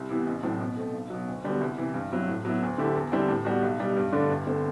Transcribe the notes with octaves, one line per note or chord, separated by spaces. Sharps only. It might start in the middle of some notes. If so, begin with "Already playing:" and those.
Already playing: C2
C3 E3 B3 E4
A1
A2 F#3 C4
B2
A3 C4
B1
B2 F#3
D2
D3 G3 B3 F#4
C2
C3 E3
G2
F#3 C4 E4
A2
F#3 B3 E4
D2
D3 A3 E4 G4
E2
D3 G3 C4 E4
A2
G3 B3 F#4
B1
B2 G3 B3
G2
D3 A3 D4
G1
D3 A3 C4